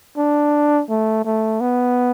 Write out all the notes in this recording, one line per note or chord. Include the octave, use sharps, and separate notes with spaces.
D4
A3
A3
B3